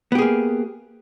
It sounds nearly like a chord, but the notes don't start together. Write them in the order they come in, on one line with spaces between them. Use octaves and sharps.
B3 G4 G#4 A#3